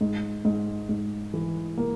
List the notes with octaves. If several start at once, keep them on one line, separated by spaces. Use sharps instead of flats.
G#2
G#2
G#2
E3
A#3